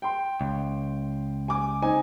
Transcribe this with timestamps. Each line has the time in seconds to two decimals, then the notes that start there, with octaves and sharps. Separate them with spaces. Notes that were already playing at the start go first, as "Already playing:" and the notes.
0.02 G5 C6
0.41 C#2
1.48 G#5 D6
1.82 C4 D#4 G#5